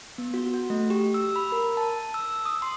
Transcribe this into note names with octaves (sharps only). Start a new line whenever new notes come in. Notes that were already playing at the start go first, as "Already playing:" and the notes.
B3
F#4
F#4
A3
G4
E6
B5
A#4
A5
E6
D#6
C6